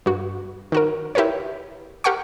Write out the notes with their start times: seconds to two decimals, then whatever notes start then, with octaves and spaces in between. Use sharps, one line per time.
0.06 G2 F#4
0.72 D#3 F#4 A#4
1.15 E4 G4 A#4 B4 C#5
2.04 G4 A#4 F#5 G5 C#6